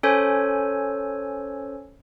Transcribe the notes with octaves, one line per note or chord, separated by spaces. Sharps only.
C#4 A4 C5 C#5 G#5